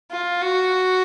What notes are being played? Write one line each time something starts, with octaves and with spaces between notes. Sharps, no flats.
F4
F#4